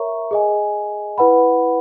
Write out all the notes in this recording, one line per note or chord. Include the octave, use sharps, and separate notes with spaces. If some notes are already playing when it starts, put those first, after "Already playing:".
Already playing: A#4 C#5 E5 A#5 C#6
G#4 D#5 G#5
E4 B4 F#5 B5